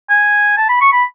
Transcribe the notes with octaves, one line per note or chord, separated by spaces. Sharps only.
G#5
A5
B5
C#6
B5